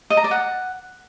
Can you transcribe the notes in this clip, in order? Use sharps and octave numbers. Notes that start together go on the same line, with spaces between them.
D#5
A#5
D5
F#5